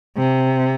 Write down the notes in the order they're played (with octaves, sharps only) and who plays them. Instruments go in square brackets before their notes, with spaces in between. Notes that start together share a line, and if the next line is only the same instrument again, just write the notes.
[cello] C3